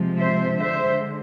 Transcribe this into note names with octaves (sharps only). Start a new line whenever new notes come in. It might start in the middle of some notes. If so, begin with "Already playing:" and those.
Already playing: C3 F3 G#3
C5 E5
D3 G#3 C5 E5